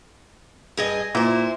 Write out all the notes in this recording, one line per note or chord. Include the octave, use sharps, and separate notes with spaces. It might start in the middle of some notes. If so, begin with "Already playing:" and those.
G2 G#4 D#5
A#2 E4 C5